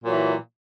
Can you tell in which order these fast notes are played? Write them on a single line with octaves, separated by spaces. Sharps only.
A#2 F#3 E3